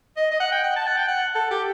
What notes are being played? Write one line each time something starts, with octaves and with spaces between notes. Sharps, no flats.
D#5
D#5
F#5
G5
F#5
A5
F#5
G5
F#5
A4
G4